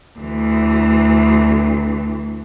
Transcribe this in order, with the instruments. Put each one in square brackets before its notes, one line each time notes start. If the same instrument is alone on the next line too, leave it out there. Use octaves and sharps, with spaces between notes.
[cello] D2 E3